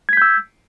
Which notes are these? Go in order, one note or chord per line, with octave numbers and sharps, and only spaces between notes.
E6 G6 G#6 B6